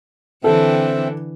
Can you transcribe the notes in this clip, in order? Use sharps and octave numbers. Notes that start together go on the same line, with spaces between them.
D3 E3 C4 A4 E5 G5